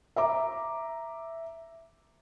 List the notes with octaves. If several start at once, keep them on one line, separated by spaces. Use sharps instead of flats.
E5 A#5 D6